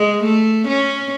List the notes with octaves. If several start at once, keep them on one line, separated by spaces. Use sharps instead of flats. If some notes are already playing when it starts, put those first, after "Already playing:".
Already playing: G#3
A3
C#4